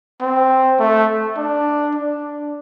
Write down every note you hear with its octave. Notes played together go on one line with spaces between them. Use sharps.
C4
A3
D4
D4